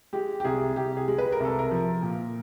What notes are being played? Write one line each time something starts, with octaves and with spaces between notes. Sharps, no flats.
G#3 G4
G4
C2 G#4
C2 G4
G#4
G#3
B4
A#4
C2 A4
A#4
F3
A#2